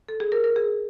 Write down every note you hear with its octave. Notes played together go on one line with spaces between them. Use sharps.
A4
G#4
A#4
A#4
G#4